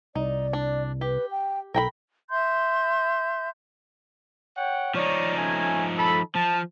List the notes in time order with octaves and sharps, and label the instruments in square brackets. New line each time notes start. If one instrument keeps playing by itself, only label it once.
[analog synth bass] C2 [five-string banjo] D#4 [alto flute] D5
[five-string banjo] D4
[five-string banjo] G4 [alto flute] B4
[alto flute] G5
[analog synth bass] B1 [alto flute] A4 [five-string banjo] A#4 G5 B5
[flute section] E5 C6 G6
[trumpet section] C#5 F#5 G5
[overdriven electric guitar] F3 D#4 [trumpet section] C#5 D5
[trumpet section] A3 C#4 G#5
A4 B5
[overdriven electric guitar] F3 [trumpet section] A5